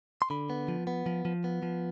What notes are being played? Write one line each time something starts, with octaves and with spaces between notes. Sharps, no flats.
C6
D3 B5
B3
F3
B3
F3
F3
B3
F3